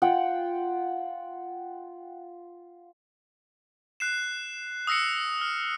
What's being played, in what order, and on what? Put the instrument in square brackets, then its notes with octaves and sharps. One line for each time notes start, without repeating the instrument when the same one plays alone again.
[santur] F4 F#5 G5
[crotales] F#6 C7 E7
D#6 E6 A#6 C7 C#7
F6